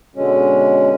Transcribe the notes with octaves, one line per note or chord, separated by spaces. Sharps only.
B2 D3 G#3 C#4